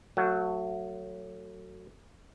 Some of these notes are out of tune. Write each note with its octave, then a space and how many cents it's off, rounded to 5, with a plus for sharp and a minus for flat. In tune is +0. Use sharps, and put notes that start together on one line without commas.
F#3 +0 A3 +30 F#4 +0